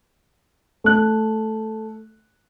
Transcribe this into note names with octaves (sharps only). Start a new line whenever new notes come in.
A3 F#6